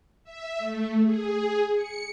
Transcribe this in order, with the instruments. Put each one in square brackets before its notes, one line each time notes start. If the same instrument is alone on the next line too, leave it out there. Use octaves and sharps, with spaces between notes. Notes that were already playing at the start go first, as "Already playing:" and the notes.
[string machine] E5
A3
G#4
C#7